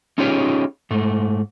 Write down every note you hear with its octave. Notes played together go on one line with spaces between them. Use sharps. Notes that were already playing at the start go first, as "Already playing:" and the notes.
C#4 D#4 F4 G4 G#4 C#5
G#2 A3